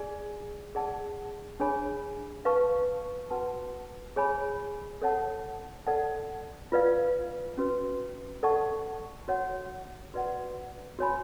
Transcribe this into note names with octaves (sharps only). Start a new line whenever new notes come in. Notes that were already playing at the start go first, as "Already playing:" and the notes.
Already playing: G#4 D5 G#5
G#4 D5 F#5 A5
D4 G#4 C#5 G#5 B5
B4 F5 A5 C#6
F#4 B4 F#5 A5
G#4 C#5 G#5 B5
A4 C#5 F#5 A5
A4 D5 F#5 A5
F4 B4 D5 F5
C#4 F#4 B4
A4 D5 F#5 A5 C#6
F#4 C#5 F#5
F#4 B4 D5 F#5
F#4 C#5 G#5 B5